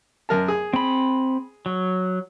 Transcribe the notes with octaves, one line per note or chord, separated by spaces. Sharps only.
F#2 A#4 A5
G#4
C4 B5
F#3